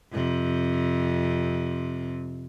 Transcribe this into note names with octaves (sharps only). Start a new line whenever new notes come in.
F2 C3